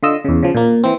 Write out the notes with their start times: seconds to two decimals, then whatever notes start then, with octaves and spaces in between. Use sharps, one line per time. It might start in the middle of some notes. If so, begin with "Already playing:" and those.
0.03 D3 F4 D#5 E6
0.25 E2 C#3
0.43 C#3 F3
0.55 A#2 A#3
0.84 E3 C4